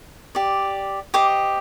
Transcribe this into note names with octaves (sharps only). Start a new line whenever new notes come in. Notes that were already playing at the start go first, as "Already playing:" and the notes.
G4 D5
G4 C5 D#5 D6